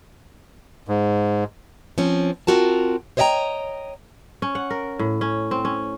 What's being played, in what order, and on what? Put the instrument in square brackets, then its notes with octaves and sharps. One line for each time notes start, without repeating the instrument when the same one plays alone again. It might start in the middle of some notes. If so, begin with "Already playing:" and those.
[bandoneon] G#2
[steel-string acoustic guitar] F3 C4 C#4
C4 F4 F#4 A#4 A5
C5 C#5 D#5 E5 G5 A#5
[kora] C#4
F#5
A#4
A2
C#4
C4
C#4